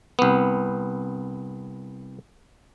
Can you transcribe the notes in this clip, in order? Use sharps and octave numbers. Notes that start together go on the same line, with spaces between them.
C2 B3